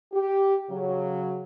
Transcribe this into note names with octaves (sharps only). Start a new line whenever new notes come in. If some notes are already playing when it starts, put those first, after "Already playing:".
G4
C#3 F#3